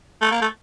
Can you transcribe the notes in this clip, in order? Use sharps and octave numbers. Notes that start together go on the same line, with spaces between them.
A3
A#3
A3